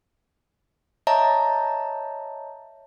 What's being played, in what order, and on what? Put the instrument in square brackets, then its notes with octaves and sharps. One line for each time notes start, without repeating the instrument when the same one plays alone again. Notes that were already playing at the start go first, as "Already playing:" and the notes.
[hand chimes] C#5 D#5 E5 A5 A#5